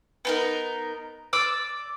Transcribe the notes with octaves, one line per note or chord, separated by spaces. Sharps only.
B3 D#4 A#4
D5 D6 E6